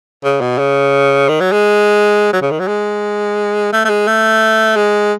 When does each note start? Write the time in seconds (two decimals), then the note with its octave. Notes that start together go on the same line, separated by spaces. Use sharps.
0.24 C#3
0.41 B2
0.58 C#3
1.29 D#3
1.40 F#3
1.52 G#3
2.33 F#3
2.42 C#3
2.51 D#3
2.59 F#3
2.68 G#3
3.73 A3
3.85 A3
3.89 G#3
4.07 A3
4.76 G#3